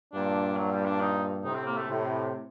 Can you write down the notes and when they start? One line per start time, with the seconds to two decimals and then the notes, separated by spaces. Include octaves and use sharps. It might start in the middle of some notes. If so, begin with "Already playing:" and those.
0.13 G2 A#2 D4
0.57 F#3
0.72 G3
0.86 D4
1.00 D#4
1.44 A2 C3 D#4
1.54 C4
1.66 A#3
1.77 A3
1.87 A2 C3